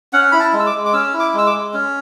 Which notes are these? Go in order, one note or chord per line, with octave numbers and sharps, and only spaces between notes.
C#4 F#5
E4 B5
A5
G#3
E6
D6
G#3
D6
C#4 E6
E4
D6
G#3 E6
D6
G#3
C#4